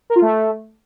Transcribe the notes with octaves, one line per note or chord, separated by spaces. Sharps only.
A#4
F4
A3